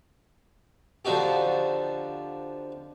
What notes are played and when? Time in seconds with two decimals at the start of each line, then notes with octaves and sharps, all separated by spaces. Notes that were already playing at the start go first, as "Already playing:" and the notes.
1.05 D3 F3 D#4 F#4 G4